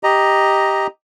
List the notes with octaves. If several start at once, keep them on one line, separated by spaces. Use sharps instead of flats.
G4 D#5 A#5